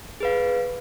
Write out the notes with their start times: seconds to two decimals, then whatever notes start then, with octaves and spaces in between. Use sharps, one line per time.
0.20 G#4 B4 F5